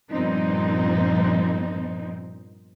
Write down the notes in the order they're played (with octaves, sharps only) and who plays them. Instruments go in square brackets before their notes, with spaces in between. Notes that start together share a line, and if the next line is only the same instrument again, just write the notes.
[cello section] G2 A#2 F3 B3 C4 D#4